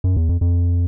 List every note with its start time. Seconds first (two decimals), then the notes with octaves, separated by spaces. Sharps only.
0.04 F#2
0.16 E2
0.29 F2
0.41 F2